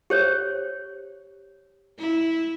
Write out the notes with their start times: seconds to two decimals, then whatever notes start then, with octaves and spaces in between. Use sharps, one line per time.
0.10 G4 C5 C#5
1.98 E4